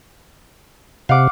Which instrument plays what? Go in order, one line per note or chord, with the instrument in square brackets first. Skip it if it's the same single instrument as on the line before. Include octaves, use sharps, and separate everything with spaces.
[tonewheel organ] C3 [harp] F5 F#5 D6